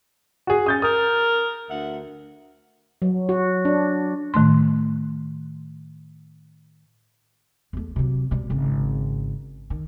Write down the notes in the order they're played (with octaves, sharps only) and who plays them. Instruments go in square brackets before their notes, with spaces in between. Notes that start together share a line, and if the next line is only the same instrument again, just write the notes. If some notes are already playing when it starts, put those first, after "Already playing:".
[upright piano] F#4 G#4
[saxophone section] C#4 [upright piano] D#6 G6 A6
[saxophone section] A#4 [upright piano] D#6
[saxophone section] D2 E5 F#5
[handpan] F#3
F#4
D4
[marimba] A2 D#3 A3 C6
[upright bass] E2 A3
C3 F#3
B2 G3
G#1 C#3
D#3